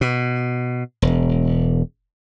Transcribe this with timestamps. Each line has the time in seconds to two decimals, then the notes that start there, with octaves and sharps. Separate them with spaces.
0.01 B2
1.02 E1